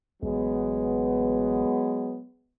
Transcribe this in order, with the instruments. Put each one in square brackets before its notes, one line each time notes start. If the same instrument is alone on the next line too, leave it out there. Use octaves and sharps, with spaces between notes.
[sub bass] A1 [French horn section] F#3 G#3 B3